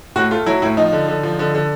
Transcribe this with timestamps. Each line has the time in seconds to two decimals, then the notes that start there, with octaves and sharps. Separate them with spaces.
0.16 A2 F#4
0.31 A3 F4
0.46 F#3 E4
0.62 A2 E4
0.77 F3 D#4
0.92 D3
1.08 D3
1.23 F3
1.39 D3
1.55 D3